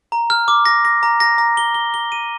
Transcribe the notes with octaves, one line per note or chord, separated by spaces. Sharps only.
A#5
F6
D6
A#6
A#6
A#5
A#6
A#5
G7
G7
G7
D#7